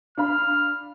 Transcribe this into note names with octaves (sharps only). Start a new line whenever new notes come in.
D4 F5 B5 F6